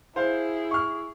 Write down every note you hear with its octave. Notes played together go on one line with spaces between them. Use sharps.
E4 G#4 C5 F5
C#6 F6